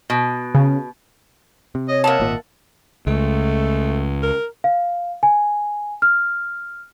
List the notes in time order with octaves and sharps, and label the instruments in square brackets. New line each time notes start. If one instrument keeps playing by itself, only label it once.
[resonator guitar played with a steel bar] B2
[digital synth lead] C#3
[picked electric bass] C3
[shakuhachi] C#5 [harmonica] D#5
[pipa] A#3 A5 [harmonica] D#5 E5 F#5
[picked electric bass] G#1 A#2
[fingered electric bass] C#2 [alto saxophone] A3
[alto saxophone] A#4
[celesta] F5
G#5
F6